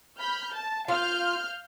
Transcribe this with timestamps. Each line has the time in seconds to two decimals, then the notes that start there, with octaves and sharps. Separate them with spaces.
0.18 B5 F6 G6
0.53 A5
0.88 F4 F5 F6 G6